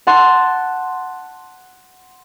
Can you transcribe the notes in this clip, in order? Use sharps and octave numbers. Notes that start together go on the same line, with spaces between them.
F#5 A5 C6